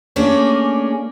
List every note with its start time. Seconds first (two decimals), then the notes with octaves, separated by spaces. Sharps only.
0.16 A3 A#3 C#4 D4 G#4